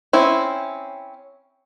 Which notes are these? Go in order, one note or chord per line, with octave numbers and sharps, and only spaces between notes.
C4 C#4 E4